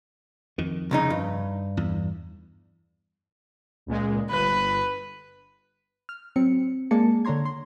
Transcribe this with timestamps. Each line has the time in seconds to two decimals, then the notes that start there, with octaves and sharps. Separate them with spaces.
0.58 F2 D#3
0.91 C2 C#3 D#4
1.10 G2
1.77 E2
3.86 C#2 A#2 G#3
4.30 G1 B4
6.09 F6
6.36 F#3 C4 C#7
6.91 G#3 A#3 G#4 D5 A5 C#7
7.25 D3 D4 C#5 A#5 C6 G#6
7.45 C6